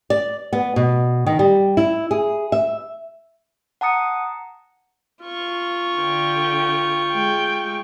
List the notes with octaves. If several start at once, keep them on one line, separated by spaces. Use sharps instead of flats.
D5
B3
B2
D#3
G3
E4
G#4
E5
F#5 A5 A#5 D#6 C#7
F4 C#6
D3 G5
G#3 G5